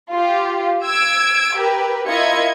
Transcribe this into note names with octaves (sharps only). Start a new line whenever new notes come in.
F4 G4
E6 G#6 D7
G4 A#4 B4
E4 F4 A#4 D#5 G#6 C#7